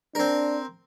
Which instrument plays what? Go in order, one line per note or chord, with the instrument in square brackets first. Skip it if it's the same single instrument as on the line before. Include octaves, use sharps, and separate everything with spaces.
[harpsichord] C4 A#4 [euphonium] D4